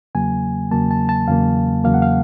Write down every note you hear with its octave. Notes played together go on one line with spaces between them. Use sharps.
E2 C#3 F#3 A#3 G#5
E2 C#3 F#3 A#3 A5
A5
A5
E2 C#3 F#3 A#3 F5
E2 C#3 F#3 A#3 F5
F#5
F5